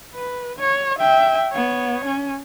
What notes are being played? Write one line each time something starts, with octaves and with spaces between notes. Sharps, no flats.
B4
C#5
E5 G5
B3 C#5
C#4